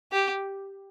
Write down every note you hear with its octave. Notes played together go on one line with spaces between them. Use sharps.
G4